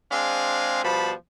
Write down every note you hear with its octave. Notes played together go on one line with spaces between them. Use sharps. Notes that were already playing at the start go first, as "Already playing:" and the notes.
G#3 C4 D4 G#4 F5
B2 F3 G3 A5 B5